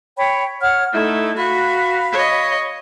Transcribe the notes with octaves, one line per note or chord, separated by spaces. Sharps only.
C#5 G5 B5
C#5 F#5 F6
A3 D#4 E4
F#4 F5 B5
C#5 D#5